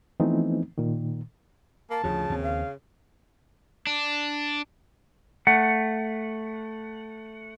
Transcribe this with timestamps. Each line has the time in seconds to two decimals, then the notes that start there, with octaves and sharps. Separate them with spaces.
0.20 E3 F3 A3 B3 C4 D#4
0.78 A#2 D#3
1.90 A#3 A5
2.04 D2 C#3 F3
2.30 D#2 C4
2.43 F5
3.87 D4
5.47 A3 F#5